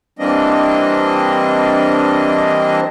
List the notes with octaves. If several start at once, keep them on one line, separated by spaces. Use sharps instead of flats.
E3 G3 A#3 C4 D4 D#5